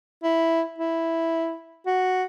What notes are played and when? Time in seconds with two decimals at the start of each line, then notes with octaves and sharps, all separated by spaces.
0.24 E4
0.78 E4
1.86 F#4